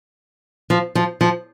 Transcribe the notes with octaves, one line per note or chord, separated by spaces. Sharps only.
F3
F3
F3